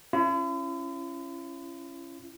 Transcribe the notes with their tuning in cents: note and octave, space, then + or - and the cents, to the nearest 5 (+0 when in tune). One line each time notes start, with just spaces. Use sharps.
C#4 -10 E4 +45